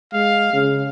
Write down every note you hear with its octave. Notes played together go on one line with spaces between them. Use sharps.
G#3 F5
C#3